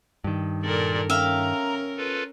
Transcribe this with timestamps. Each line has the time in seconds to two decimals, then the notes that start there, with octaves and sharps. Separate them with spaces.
0.24 G2 D#3
0.63 A#2 A4 A#4 D5
1.10 C#4 A#4 E5 F5 G5 A#5
1.97 F4 A4 B4